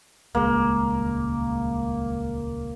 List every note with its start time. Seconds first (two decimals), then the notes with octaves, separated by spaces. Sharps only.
0.35 D#1 C#2 G#3 A#3